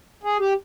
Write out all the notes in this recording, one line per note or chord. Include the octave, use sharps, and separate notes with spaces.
G#4
G4